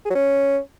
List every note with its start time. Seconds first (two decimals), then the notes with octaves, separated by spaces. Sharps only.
0.05 G#4
0.10 F#3
0.15 C#4